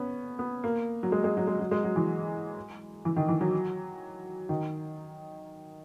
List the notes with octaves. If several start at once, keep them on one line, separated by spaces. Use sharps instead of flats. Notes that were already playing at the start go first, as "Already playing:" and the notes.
Already playing: B3 C#4
B3
A#3
F#3
G#3
G#3
F#3
G#3
F#3
G#3
F#3
E3
E3
D#3
E3
F#3
D#3